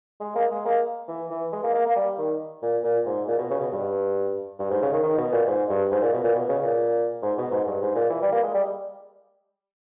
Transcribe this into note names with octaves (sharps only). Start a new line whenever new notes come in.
G#3
A#3
G#3
A#3
E3
E3
G#3
A#3
A#3
A#3
G3
D#3
A#2
A#2
G#2
A#2
B2
C#3
B2
G2
G2
G#2
C#3
D#3
D#3
B2
A#2
G#2
G2
G#2
A#2
B2
A#2
B2
C#3
A#2
G#2
B2
G#2
G2
G#2
A#2
E3
G3
A#3
G#3
G3